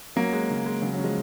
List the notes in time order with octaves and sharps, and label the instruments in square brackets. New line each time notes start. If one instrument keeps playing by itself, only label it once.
[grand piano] F#3 A#3 [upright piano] C#4
[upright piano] G#3
C#3
G#3
[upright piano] C#3 [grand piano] F#3
[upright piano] C#3 [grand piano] F#3
[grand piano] F3 G#3